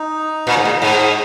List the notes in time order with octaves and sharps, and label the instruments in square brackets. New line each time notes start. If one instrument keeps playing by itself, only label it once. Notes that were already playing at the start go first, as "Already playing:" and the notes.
Already playing: [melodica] D#4
[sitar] A#2
G#2
A#2
G#2